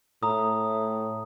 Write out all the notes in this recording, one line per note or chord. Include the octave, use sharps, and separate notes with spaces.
A2 A#5 D#6